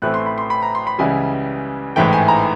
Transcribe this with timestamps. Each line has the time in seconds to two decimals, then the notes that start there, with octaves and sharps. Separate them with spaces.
0.02 A1 A2 E3 A3 C4 F#6
0.14 C6
0.26 B5
0.38 C6
0.50 B5
0.62 A#5
0.75 C6
0.87 B5
0.99 C#2 C#3 E3 G3 G#5
1.96 A1 G#2 E3 A3 G5
2.13 G#5
2.28 A#5